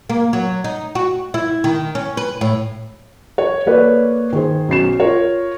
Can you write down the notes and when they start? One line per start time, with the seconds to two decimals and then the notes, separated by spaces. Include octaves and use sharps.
0.10 A#3
0.33 F#3
0.64 D#4
0.95 F#4
1.34 E4
1.64 D#3
1.95 C#4
2.17 B4
2.41 A2
3.38 C#5
3.66 A#3 A4 B4 C#5 D5
4.33 D#3 G#4 C5
4.69 B1 C#4 C7 E7
5.00 F4 A#4 C#5